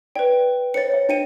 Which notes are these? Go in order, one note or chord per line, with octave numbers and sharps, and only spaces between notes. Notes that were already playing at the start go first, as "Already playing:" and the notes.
B4 D5 G5
C5 C#5 D#5 A6 C#7
C#5 E5
D4 D#5 E5 G5 C#7 D#7